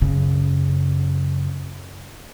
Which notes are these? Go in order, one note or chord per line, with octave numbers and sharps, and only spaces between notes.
F#2 C#3